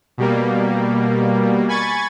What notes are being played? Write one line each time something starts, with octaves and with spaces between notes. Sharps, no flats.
B2 G3 A#3
G#5 B5 C#6 G#6 A6